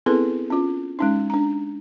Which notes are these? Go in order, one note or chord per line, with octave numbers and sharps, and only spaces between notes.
B3 C4 E4 G#4 A4 B4
C#4 F4
G#3 C#4 D#4
D4 A#5